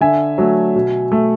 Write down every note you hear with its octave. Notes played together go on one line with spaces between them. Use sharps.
D3 E5 G#5
F#3 A3
B2
A3